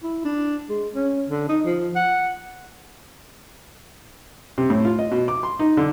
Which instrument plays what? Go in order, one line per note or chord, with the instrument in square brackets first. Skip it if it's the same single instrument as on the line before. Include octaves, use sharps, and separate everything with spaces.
[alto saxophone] E4
D4
G#3
C#4
D3
D#4
F3
F#5
[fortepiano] C3
A2
F4
D#5
B2
D6
C6
D#4
D3